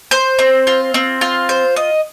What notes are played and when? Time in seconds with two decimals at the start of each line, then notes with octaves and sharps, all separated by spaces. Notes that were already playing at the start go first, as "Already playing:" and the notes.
0.11 C5
0.39 C4
0.67 F4
0.94 C4
1.21 F4
1.49 C5
1.76 D#5